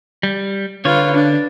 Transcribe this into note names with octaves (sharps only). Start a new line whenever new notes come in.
G3
D3 F4 B4 C#5
D4